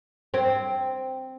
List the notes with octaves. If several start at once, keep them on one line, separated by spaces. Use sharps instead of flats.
C4